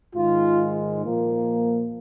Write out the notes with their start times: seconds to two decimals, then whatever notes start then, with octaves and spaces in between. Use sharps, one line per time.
0.14 G#2 D#3 G#3 F4
1.03 A#2 F3 A#3